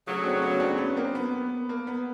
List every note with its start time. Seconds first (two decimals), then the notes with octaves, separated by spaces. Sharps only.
0.06 D2 C#3 F#3
0.24 C4 D4
0.42 B3 C#4
0.60 C4 D4
0.78 B3 C#4
0.96 A#3 C4
1.15 B3
1.69 A#3
1.87 B3